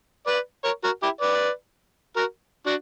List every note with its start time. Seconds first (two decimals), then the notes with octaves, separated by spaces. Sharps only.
0.26 B4 D5
0.64 A#4 C#5
0.84 F#4 A#4
1.02 E4 G4
1.21 B4 D5
2.16 F#4 A#4
2.66 D4 F#4